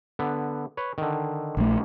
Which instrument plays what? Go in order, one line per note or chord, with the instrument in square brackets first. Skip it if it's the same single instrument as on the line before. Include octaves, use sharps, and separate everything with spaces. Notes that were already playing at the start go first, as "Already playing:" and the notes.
[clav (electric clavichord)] D3 B3
B4 C#5
D3 D#3
[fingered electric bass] A#1 A3